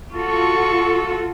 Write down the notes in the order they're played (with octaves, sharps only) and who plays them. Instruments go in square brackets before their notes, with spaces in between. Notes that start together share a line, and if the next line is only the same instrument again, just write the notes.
[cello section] F4 F#4 A4 [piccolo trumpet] C#6